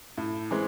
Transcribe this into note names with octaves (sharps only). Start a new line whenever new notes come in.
A2
E3 G#3 C4